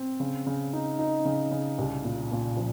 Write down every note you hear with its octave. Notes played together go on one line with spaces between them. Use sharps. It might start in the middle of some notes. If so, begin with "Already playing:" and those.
Already playing: C4
C#3
C#3
D#4
D#4
C#3
C#3
C2
A#2
A#2
F3